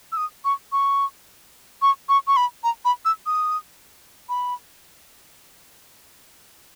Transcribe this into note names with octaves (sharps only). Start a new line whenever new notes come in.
E6
D#6
C#6
C#6
C#6
C#6
C#6
B5
A#5
B5
E6
D#6
B5